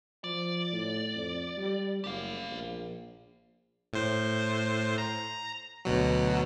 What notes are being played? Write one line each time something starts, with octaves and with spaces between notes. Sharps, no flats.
F3 D5
A2
F2
G3
F#1 G4 F5
A#1
A2 C5
A#5
D2 B2 F#3